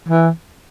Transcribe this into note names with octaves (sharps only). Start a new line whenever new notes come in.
E3